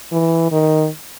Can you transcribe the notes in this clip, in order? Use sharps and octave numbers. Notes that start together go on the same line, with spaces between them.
E3
D#3